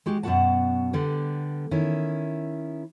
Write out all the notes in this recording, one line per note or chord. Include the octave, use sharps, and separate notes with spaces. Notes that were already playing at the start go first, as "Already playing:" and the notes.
G#3 F#4 G4
F#2 B2 D#3 F#4 F#5 A5
D3 G3 B3
D#3 C#4 E4